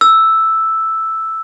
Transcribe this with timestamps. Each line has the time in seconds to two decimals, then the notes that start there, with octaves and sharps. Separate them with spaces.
0.01 E6